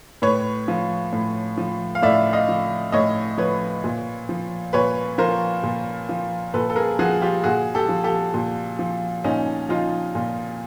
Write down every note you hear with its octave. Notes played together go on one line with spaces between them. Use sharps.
A2 B4 C#5
F3
A2
F3
F5
A2 D5 E5
D#5 F5
F3
A2 C#5 D#5
F3 B4 C#5
A#2
F3
A#2 B4 C#5
F3 A#4 C5
A#2
F3
A#2 A4 B4
A4
G#4 A#4
F3 F#4 G#4
F4 G4
A#2 F#4 G#4
G4 A4
F3
G4 A4
A#2
F3
A#2 C#4 D#4
F3 D#4 F4
A#2